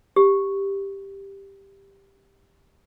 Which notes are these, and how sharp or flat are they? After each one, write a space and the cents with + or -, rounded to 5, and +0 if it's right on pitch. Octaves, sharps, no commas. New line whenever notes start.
G4 +5